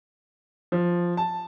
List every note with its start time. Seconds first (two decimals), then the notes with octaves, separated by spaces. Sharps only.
0.72 F3
1.17 A5